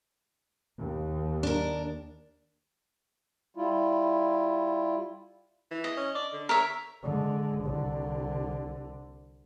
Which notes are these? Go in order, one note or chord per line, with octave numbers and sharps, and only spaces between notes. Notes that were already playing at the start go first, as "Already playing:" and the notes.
D#2
D4 A#4
G3 E4 F4
E3
D#5
C#4
D5
D3
A#4 C#5 E5
D3 G#3
C2 D3